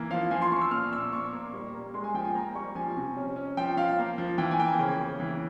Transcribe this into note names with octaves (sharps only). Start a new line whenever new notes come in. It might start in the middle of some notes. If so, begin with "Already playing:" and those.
Already playing: E3 A#3
F3 F5
F3 G#5
C6
F3 C#6
E6
A#2 F6
A#2 E6
A#2 C#6
A#3
G3
A#3
G#3 C6
G#5
F3 G5
G#5
A#3 A#5
G3 C#6
F3 G#5
C3
C#4
C#4
F3 G5
F3 F5
A#3
F3
E3 G5
G#5
A#3 G5
C#3
C#3
E3